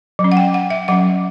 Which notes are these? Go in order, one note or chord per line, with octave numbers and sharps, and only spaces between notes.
F#3
C#4
F#5
G5
F#5
E5
F#3 C#4 F#5